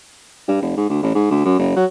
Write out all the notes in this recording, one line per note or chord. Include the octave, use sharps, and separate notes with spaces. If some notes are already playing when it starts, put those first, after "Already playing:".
G2
F1
G#2
D2
A1
G#2
D2
F#2
F#1
F#3